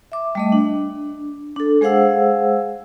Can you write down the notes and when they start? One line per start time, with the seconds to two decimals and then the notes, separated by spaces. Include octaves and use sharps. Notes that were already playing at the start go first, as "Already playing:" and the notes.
0.12 E5 D6
0.35 G3 A3 D#5
0.52 D4
1.56 D4 A4
1.81 G#3 G#4 C5 F5 F#5 E6